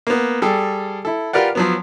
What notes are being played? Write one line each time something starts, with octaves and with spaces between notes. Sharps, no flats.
A#3 B3
G3 G#4 A4
E4 A4
F4 G4 A#4 B4 D5 F#5
F3 F#3 B3